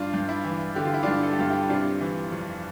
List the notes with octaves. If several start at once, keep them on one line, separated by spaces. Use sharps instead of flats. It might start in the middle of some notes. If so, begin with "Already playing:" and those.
Already playing: G2 D4 F4
G2
E4
E3
D3 G4
F4
E4
G2 D4 F4
A4
G4
G2 F4
E4 G4
C3 D4 F4
E3
F2